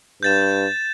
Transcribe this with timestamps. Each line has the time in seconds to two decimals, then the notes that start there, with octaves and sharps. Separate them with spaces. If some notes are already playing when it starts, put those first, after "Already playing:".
0.23 G2 G6 A6 E7